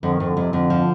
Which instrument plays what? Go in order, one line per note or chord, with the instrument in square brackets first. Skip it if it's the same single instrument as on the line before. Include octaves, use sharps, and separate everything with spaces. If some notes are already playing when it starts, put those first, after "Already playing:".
[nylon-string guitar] F2 [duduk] D3
[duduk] D#3
[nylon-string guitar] F2
[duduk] D3
[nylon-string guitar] F2 [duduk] C3
[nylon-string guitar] F2 [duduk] D3
[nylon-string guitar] F3